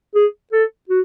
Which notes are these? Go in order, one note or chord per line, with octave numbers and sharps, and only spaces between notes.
G#4
A4
F#4